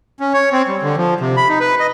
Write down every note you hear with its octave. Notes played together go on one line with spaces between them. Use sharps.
C#4
C#5
C4
G3
D3
F3
C3
B5
D#4
B4
D#5